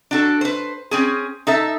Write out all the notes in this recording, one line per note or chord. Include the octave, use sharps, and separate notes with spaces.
D4 F#4 A4
B4 C5
C4 C#4 G#4
D#4 A4 E5